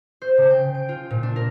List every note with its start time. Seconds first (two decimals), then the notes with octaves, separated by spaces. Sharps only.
0.22 C5
0.38 C#3
0.50 G5
0.75 D7
0.89 F4
1.11 A#2
1.23 D4
1.36 A#4